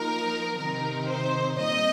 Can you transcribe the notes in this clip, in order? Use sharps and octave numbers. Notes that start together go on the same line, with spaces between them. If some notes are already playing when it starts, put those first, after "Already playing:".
Already playing: F3 A#3 D#4 A#4
C3 D#3 C4 D#4 A#4
C5
A#2 G3 C4 D#5